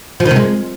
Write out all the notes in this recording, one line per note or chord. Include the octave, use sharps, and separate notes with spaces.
F3
D#3
C3
G#3